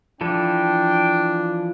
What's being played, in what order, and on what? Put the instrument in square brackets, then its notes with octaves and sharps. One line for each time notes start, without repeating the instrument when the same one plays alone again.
[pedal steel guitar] E3 F3 A4 [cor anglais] D4 [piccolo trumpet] G5